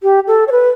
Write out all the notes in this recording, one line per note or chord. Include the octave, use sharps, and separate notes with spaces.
G4
A4
C#5
B4